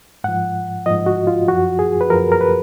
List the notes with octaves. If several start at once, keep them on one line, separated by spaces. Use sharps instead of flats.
G#2 F3 F#5
G#2 F3 D#5
F#4
F4
F#2 F3 F#4
G#4
B4
F#2 F3 A#4
A#4
B4